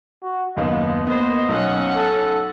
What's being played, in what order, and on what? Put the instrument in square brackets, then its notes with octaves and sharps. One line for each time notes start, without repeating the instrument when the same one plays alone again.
[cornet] F#4
[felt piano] F#1 D#2 F5 [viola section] B3 [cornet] D#5
[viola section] A#3 C5 [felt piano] B3 [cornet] D#5
[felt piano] B1 [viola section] C#4 F#5
[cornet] A4